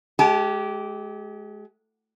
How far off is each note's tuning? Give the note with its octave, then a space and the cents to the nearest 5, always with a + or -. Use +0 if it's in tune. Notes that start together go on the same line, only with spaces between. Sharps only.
G#3 +30 G4 -15 A5 -30